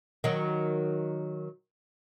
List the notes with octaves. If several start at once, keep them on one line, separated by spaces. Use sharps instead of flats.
D#3 F#3